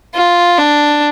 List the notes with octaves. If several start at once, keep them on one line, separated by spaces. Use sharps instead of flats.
F4
D4